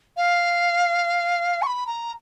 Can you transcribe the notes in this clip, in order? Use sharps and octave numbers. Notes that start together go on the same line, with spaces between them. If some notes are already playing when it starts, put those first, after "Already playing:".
F5
C#6
B5
A#5